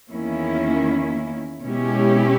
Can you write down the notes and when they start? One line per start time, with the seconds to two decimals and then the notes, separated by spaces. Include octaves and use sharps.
0.12 E2 D#3 A#3 C#4 E4
1.63 B2 G#3 C#4 E4 G4